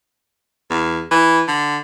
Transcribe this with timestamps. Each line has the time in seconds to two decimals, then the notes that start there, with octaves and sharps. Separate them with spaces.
0.70 E2
1.11 E3
1.47 D3